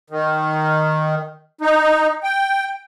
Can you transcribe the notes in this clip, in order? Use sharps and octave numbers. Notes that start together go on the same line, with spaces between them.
D#3
D#4
G5